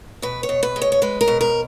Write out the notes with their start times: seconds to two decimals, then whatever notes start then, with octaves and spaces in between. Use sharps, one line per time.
0.22 B2 B4
0.43 C#5
0.49 B2
0.63 B4
0.76 G#3
0.82 C#5
0.92 C#5
1.02 G#3 B4
1.21 A#4
1.28 B2
1.41 A#4